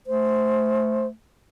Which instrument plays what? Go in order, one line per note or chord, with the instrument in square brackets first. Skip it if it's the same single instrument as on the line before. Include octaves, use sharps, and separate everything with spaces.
[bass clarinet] A3 [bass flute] C5